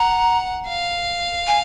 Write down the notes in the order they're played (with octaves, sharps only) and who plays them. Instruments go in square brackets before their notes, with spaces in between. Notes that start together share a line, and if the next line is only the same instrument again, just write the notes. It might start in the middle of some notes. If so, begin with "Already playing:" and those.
Already playing: [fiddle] F#5 [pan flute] A#5
[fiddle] F5
[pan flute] G#5